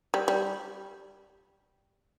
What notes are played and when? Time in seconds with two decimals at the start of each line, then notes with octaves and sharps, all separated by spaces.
0.14 G3
0.28 G3